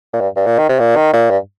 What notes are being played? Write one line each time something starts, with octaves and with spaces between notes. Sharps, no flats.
A#2
G2
G2
A#2
D#3
C3
A#2
D#3
A#2
G2